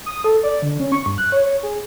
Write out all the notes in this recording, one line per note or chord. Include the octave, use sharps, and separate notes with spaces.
D#6
A4
D5
D3
C#4
C#6
G2
F#6
C#5
C#5
G#4